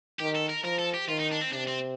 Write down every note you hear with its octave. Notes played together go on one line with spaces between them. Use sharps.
D#3 G4
A4
A#4
F3 A#4
A4
G4
D#3 F4
D#4
D4
C4
C3 D4
C4